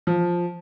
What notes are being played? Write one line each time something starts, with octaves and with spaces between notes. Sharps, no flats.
F3